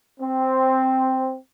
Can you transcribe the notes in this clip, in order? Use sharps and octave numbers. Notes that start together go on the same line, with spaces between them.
C4